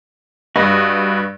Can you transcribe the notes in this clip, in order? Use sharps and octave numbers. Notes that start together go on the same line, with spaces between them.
G2 F#4 B4 D#5